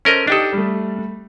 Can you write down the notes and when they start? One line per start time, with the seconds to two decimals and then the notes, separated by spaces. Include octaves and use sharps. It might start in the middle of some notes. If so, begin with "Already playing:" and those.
0.05 C#4 A4 A#4 C5 D#5
0.28 D4 D#4 G4 A4 D#6
0.53 G3 A3